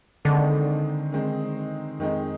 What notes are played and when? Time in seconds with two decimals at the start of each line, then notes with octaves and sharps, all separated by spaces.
0.25 D3 D#3 G#3 C4 D#4
1.12 D#3 G#3 C4 D#4
1.99 F2 D#3 G#3 C4 D#4